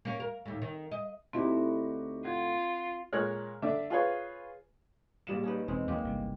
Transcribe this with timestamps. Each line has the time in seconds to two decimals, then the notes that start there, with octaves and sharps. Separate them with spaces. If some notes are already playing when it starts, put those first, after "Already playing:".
0.05 A#3 C#4
0.20 A#4
0.46 D#2 A2
0.62 D#3
0.91 D#5
1.33 D2 C4 D#4 E4 F#4 G4
2.24 F4 F#5 G#6
3.13 A#2 G#3 A#4 C#5 F6 F#6
3.62 D3 D4 E5
3.90 F4 G#4 B4 C#5
5.27 A#1 G3 D5 D#5 F5 E7
5.43 C#4 D#4 B4
5.68 E1 G#3 C4
5.88 D#2 F3 F#3 G#3 A#3 G4
6.03 G1 C2 C#3